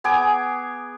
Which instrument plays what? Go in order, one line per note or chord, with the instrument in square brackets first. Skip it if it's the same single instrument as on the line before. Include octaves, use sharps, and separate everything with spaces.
[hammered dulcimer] B3 G#4 G#5 D6